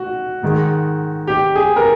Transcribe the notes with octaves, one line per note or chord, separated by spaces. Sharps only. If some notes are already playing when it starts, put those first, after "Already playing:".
Already playing: F#4
G#2 D#3 G#3
G4
G#4
A#4